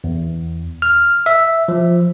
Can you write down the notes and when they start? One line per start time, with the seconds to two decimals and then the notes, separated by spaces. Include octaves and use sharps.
0.04 E2
0.82 F6
1.26 E5
1.68 F3